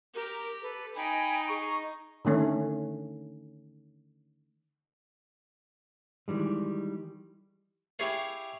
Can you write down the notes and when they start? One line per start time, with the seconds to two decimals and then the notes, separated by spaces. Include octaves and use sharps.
0.14 G4 A#4
0.61 A4 B4
0.95 D#4 D#5 G5 G#5 B5
1.47 G#4 A#5 C#6
2.25 D3 D#3 A3 C#4
6.28 D#3 E3 G3 G#3
7.99 E4 G4 G#4 C#5 F5